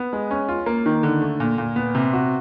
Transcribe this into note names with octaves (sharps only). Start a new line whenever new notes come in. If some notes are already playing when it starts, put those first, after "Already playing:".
Already playing: B3
G#3
C#4
F4
A#3
D#3
D3
A3
A#2
A#2
B3
C3
F#4